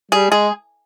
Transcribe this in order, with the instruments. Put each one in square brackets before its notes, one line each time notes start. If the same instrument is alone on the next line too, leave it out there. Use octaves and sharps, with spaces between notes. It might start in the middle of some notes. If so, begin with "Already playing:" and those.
[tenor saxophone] G3 [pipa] G#4
[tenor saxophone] G#3 [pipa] G#4